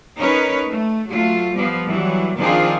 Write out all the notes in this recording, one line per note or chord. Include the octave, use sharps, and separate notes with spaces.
C#4 D#4 A#4 B4 C#5
A3
F#3 A3 F4
F3 G3 B3
E3 F#3 G3
D#3 F3 C4 D4 F4 G#4